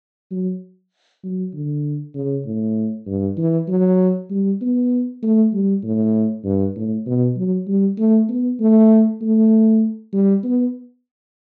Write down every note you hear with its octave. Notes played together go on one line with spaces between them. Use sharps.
F#3
F#3
D3
C#3
A2
G2
E3
F#3
G3
B3
A3
G3
A2
G2
A2
B2
F#3
G3
A3
B3
A3
A3
G3
B3